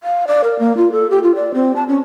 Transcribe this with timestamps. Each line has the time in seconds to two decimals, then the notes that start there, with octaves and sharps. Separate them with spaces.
0.03 F5
0.27 D5
0.44 A#4
0.59 A#3
0.77 F4
0.92 A4
1.10 G4
1.23 F4
1.35 D5
1.54 C4
1.76 A5
1.88 C#4